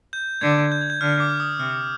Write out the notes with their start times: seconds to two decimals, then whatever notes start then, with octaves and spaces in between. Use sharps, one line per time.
0.13 G6
0.41 D3 G#6
0.72 G6
0.81 G#6
0.90 G6
1.01 D3 F6
1.20 D6
1.30 F6
1.40 D#6
1.60 C3 F6